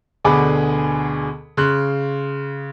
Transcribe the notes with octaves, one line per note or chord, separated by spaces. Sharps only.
D2 B2 D3 G#4 B5 D6
C#3 C6 F#6